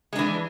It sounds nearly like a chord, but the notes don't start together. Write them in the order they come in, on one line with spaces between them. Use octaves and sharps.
G#3 D4 E3